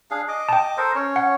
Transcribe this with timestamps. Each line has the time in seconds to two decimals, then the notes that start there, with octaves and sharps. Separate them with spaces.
0.11 D4 G#4 F5
0.28 D#5 D6
0.49 G5 A5
0.78 A4 A#4 C5
0.95 C#4 C#5
1.16 F#5